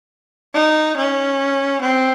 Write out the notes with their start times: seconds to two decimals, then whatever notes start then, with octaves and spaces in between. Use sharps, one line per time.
0.54 D#4
0.97 C#4
1.81 C4